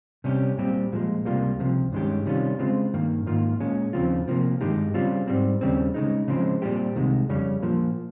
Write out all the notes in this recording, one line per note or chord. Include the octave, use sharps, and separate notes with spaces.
C3 G3 C#4 G4
A#2 G3 C4 G4
A#2 F3 G#3
C#2 C3 G3 A#3 F4
C#2 C3 F3
G2 D#3 G#3 C#4 G4
C3 D#3 G3 C#4 F4
C#3 G#3 C4 F4
G2 D#3 A#3
G#2 D#3 A#3 F4
A#2 G#3 C#4
D#2 C#3 F3 C4 F4
C3 F3 A#3
G2 D#3 G#3 D#4 G4
C#3 G3 C4 F4
G#2 G3 C4
D#2 C#3 G3 C4
C#3 G#3 D#4
C#3 F3 G#3 C4
A#2 G3 C4 G4
C2 C3 D#3 G#3
F2 C#3 G3 C#4
A#2 F3 A#3